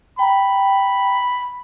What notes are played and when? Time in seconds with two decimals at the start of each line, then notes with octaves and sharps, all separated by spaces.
0.19 G5 A#5 B5